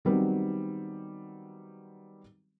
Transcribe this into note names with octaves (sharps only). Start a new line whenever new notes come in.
D#3 F#3 G3 B3 C4